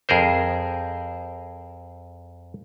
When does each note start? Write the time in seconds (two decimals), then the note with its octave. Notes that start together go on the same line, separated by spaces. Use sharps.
0.09 F2 G#4 A#4 C5